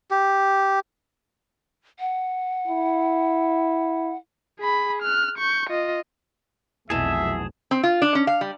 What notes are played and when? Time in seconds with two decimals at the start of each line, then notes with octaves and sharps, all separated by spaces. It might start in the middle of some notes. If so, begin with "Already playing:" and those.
0.11 G4
2.00 F#5
2.67 E4
4.59 G#4 B5
5.03 F6 F#6
5.38 C#6 G6
5.70 F4 D#5
6.90 F1 B1 F2 B2 E3 G#4 E5 A5
7.71 C4
7.83 F4
8.02 D4
8.15 C#4
8.27 F5
8.41 G3